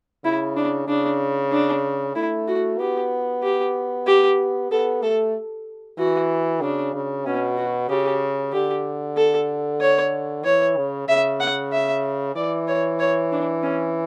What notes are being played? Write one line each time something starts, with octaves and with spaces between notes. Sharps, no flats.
C#3 E4
D4
C#3 D4
D4
A3 E4
F#4
B3 G4
G4
G4
B3 A4
A3 A4
E3 F#4
C#3 D4
C#3
B2 C#4
F#4
C#3 G4
D3 G4
A4
C#5
E3 C#5
C#3
C#3 E5
F#5
E5
E3 D5
C#5
C#5
D4
C#4